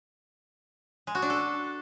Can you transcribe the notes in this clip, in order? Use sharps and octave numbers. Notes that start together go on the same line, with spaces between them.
G#3
F#4
D4
A4